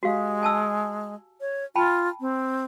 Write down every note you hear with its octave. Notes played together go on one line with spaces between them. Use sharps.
G#3 F#4 G4 F5
G#5 A5 E6
C#5
F4 G5 A5 B5
C4